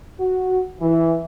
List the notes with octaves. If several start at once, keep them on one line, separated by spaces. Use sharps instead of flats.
F#4
E3